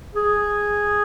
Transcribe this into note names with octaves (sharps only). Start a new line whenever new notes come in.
G#4